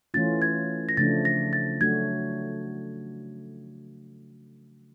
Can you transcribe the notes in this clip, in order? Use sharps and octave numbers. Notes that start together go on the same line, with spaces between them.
E3 A3 C#4 F4 A6
G#6
A#6
C#3 F3 A3 D4 A6
A#6
A6
F#3 A3 D4 F#4 G#6